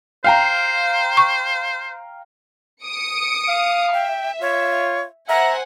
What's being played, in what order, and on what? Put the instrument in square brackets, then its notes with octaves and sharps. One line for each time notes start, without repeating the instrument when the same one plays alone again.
[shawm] C5 [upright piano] F5 G5 A#5
[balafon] C#6
[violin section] D#6 C#7 D7
[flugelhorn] F5
[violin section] E5 [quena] G5
[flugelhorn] F4 [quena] C#5
[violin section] C5 F#5 G#5 [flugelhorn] E5 [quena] A#5